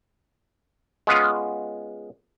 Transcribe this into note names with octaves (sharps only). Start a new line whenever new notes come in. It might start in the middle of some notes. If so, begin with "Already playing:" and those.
G#3 B3 C#4 F4 G#4